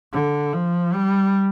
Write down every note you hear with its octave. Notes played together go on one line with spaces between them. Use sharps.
D3
F3
G3